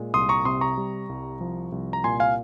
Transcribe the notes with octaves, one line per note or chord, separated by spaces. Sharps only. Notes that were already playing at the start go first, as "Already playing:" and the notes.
Already playing: A#2 G#3
C2 C6 D#6
A#5 C#6
C3 C6 D#6
A#5 C#6
G3
C2
F3
C2
A#5
A#2 G#5 C6
F5 G#5